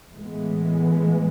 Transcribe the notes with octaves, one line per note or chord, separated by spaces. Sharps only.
A2 E3 G#3 B3